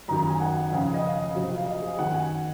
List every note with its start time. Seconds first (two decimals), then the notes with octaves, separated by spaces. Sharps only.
0.08 F#2 D#3 F#3 A#5
0.19 A#5
0.30 G#5
0.40 F#5
0.56 F#5
0.72 F2 C#3 F3
0.94 D#5
1.03 F5
1.35 F2 C3 F#3
1.57 F5
1.66 D#5
1.82 G#4
1.98 F#2 D#3 F#3 F#5
2.14 G#5